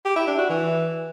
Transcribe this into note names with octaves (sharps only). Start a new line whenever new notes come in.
G4
E4
D4
F#4
E3